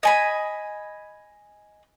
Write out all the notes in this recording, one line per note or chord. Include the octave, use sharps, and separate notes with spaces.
D#5 G#5 B5